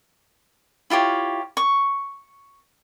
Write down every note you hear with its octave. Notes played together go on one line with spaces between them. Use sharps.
E4 F4 G4 C#5
C#6